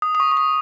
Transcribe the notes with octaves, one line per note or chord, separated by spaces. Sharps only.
D#6
D#6
C#6
C#6
D#6